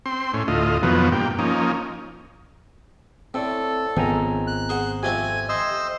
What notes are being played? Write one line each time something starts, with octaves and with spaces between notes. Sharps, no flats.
C4 C6
A2 C#4
D2 A2 F4 D#5
F2 B2 D#3 F3 F#3 B3
G2 A#3 G5
F3 A#3 C#4 D#4
A2 C4 A4 D5
G#1 C#2 D#3 B3 C4 G#5 A#5
F#6
G#4 C5 F#5
F2 A3 C4 G4 G#5
C5 D#5 E6